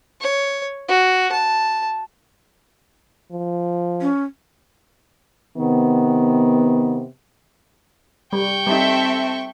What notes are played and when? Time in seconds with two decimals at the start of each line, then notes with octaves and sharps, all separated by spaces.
0.21 C#5
0.89 F#4
1.32 A5
3.31 F3
4.01 C#4
5.57 C3 D#3 B3
8.33 G3 G5 C#6
8.67 G3 C4 D#4 A4 E5